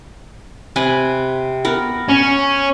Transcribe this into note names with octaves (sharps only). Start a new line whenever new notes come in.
C3 B4 G#5
B3 A#4
C#4